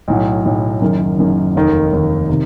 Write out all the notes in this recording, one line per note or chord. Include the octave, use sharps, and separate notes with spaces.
B1 A2 F#3
B1 A2 F#3
F#1 F#2 D#3
F#1 F#2 D#3
F1 D#2 D#3
F1 D#2 D#3
C3 D#3